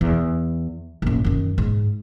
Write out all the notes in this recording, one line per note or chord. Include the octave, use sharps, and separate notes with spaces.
E2
A#1 F#2
F#2 D#3
G#2